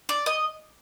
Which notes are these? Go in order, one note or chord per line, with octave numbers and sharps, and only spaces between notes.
D5
D#5